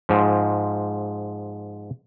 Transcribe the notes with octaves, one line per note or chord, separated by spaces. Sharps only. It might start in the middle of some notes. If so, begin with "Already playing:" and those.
G#2 F3